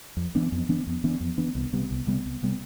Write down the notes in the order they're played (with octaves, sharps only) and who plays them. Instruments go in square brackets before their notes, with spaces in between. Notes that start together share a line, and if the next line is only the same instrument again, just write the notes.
[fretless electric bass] F2
E3 B3 D4
F2
E3 B3 D4
F2
E3 B3 D4
F2
E3 B3 D4
C2
C3 G3 B3
C2
C3 G3 B3
C2
C3 G3 B3